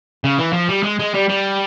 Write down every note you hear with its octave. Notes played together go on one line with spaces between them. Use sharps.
C#3
E3
F3
G3
G#3
G#3
G3
G3